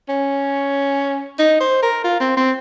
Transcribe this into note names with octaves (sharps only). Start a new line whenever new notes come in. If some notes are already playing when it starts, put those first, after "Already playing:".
C#4
D#4
C5
A#4
F4
C4
C4